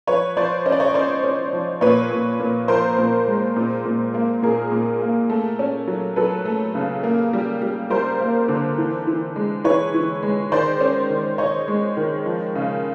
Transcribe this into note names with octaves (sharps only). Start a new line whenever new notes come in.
F3 B4 C#5
F3 C5 D5
C#4 D#5
D5
C#5 D#5
C#4 C5 D5
C#4
F3
A#2 B4 C#5
A#2
A#2
F3 A#4 C5
A#2
G#3
A#2
A#2
A#3
A#2 G#4 A#4
A#2
A#3
A3
C#4
F#3
F#3 A4 B4
A3
C#3
A#3
G3
G3
G3 A#4 C5
A#3
D3
E3
E3
G#3
E3 B4 C#5
E3
G#3
D#3 C5 D5
C#4
D#3
D#3 C#5 D#5
G#3
D#3
F3
C#3